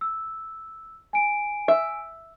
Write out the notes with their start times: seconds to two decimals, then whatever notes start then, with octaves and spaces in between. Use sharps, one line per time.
0.01 E6
1.13 G#5 D7
1.68 E5